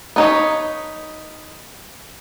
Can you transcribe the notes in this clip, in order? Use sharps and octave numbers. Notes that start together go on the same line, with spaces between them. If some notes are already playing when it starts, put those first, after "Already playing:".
B3 D#4 C#5